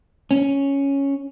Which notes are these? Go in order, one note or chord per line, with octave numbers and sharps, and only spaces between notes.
C#4